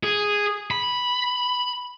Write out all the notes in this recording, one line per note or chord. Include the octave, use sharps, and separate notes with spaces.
G#4
B5